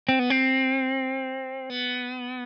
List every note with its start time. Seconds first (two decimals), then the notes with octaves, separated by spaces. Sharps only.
0.09 C4
0.19 B3
0.30 C4
1.70 B3